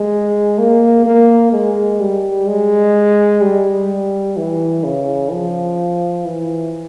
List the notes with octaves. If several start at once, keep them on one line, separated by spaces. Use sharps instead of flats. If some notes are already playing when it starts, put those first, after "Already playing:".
Already playing: G#3
A#3
A#3
G#3
G3
G#3
G3
E3
C#3
F3
E3